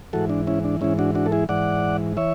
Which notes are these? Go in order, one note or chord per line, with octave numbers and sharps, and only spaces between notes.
G#2 E3 F#4 A4
D4
C#4 E4
D4
G#2 E3 C#4 E4
D4 F#4
D4 F#4
A4
E4 G#4
G#2 E3 D5 F#5
E3 C#5 E5